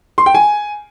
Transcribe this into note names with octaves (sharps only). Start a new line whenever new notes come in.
C6
G5
G#5